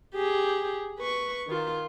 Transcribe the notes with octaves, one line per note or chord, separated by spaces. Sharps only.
G4 G#4
B4 C#6
D#3 F4